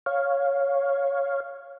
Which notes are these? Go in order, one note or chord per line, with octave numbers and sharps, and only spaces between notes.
C#5 F5